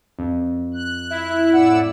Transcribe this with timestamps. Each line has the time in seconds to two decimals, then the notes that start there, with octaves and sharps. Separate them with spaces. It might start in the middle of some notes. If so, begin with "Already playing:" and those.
0.19 F2
0.74 F#6
1.10 E4 E5
1.53 A2 D5 F#5 E6